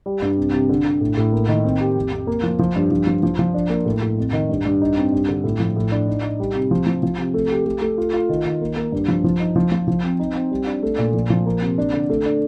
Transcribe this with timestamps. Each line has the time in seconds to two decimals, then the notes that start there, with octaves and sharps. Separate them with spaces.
0.06 G3
0.22 G2
0.37 C3
0.54 C3
0.69 D3
0.85 D3
1.01 A2
1.17 A2
1.33 A#3
1.48 D#3
1.64 C4
1.80 G4
1.96 F2
2.12 F2
2.27 A#3
2.43 F3
2.59 F3
2.76 G2
2.91 F3
3.07 F3
3.23 F3
3.39 F3
3.54 D4
3.70 A#3
3.85 A2
4.02 A2
4.18 F2
4.33 D#3
4.49 G2
4.65 G2
4.81 D#4
4.97 C4
5.12 G2
5.29 D3
5.44 A2
5.60 F3
5.76 A2
5.92 D4
6.08 D#4
6.23 D#4
6.40 G3
6.55 C3
6.71 F3
6.87 F3
7.03 F3
7.18 C3
7.34 A3
7.51 G4
7.66 A3
7.82 A3
7.98 F4
8.13 F4
8.29 D#3
8.45 D#3
8.61 A#3
8.76 A#3
8.92 G2
9.08 F3
9.24 F3
9.40 D#4
9.56 F3
9.72 F3
9.88 F3
10.03 C4
10.19 D#4
10.35 C4
10.51 G3
10.67 D4
10.83 A3
10.98 A#2
11.14 F3
11.30 F3
11.46 A#3
11.62 C3
11.78 D4
11.94 D3
12.10 A3
12.26 D4